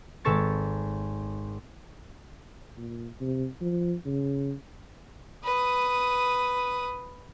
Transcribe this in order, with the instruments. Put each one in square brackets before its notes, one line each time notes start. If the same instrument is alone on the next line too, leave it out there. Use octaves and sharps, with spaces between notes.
[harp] G#1 G#3 A4 B4 C#6 A6
[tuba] A#2
C3
F3
C#3
[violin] B4 D#6